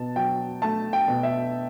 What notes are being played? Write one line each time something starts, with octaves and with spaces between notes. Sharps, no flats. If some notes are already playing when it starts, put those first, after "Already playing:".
Already playing: B2 A5
F#3 G5
A3 A5
G5
B2
E5